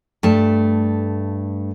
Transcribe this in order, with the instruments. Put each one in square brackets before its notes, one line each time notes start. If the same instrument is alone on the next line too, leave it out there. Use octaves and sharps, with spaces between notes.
[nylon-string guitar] G2 A3 A5